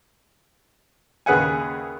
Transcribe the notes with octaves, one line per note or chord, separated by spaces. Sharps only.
D#2 C#3 G#4 B4 F#5 G#5